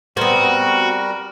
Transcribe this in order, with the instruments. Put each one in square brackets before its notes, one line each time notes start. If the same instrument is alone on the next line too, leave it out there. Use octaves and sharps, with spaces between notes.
[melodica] G3 A#4 [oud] B3 C4 [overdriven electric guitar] F#4